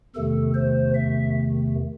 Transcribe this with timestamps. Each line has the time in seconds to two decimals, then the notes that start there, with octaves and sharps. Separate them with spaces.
0.15 E2 C3 D#3 A3 A4
0.55 C5
0.94 E5